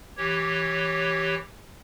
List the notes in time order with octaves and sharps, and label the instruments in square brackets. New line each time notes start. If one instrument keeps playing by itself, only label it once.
[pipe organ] E3 G4 C#5